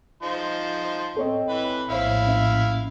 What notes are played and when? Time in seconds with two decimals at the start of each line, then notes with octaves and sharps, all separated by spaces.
0.23 F3 D#4 C5
1.17 C4 A4 C#5 D#5
1.49 E3 B4
1.90 A#1 A2 E4 C5 C#5 E5 F5
2.27 C#4 E5